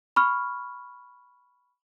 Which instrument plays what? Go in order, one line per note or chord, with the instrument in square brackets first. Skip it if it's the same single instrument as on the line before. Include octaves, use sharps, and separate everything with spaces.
[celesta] B5 C#6 F6